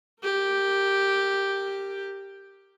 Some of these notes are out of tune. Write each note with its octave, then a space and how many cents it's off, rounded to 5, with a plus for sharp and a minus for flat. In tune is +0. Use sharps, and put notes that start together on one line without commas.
G4 +0 A#4 -20